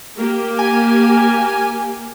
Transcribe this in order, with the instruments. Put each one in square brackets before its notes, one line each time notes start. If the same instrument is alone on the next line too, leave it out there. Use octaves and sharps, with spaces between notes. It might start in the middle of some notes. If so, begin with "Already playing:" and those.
[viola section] A#3 G4
[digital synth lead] G#5